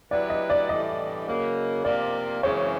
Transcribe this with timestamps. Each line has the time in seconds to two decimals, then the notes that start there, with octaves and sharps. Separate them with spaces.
0.11 F#3 B3 E4 G4 B4 D5
0.30 D#5
0.50 D5
0.68 A2 E3 G3 D#5
1.27 C#3 F#3 A#3
1.85 C3 F3 A#3 D5
2.43 F#2 C#3 E3 G#3 C4 C#5